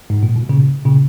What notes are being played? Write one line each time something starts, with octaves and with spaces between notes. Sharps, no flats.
G#2
A#2
B2
A#2 C#3
A#2 C#3